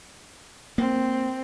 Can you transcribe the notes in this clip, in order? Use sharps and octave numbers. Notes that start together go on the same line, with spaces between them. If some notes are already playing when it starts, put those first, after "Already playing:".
A#3 C4